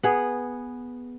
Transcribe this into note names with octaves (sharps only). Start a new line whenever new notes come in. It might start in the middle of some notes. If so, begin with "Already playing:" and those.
B3 G#4